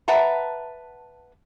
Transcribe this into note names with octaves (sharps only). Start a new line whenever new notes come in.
B4 E5 F#5 A5 A#5